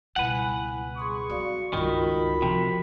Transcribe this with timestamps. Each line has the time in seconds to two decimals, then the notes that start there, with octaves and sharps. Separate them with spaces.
0.16 C#2 B2 G3 E4 B4 F#5 G#5
0.98 G#4 C6 C#6 D#6
1.30 G3 C4 F#4 D5 F5
1.73 C#2 G2 D#3 F4 F#4 A#4 B5
2.42 C3 F3